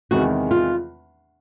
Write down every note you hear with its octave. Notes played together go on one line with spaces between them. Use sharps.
E2 C3 D#3 G#3 F#4
F4